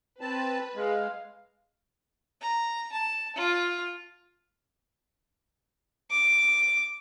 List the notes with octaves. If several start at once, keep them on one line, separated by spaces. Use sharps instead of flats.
C4 B4 A5
G#3 F5
A#5
A5
F4
D6